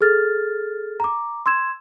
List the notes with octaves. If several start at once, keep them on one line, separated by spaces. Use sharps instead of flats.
G#4 A4 F6 A6
A#5 D6
C6 E6 G#6 E7